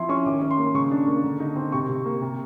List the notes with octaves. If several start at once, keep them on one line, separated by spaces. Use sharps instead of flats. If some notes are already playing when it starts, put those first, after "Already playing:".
Already playing: F3 C4 E4 C6
C#4 C#6
D#3 D6
C#4
C6
A#3
C#3 C#6
D4
A#3
D3
D#4
C4
C3 C#6
C3
A#3
C3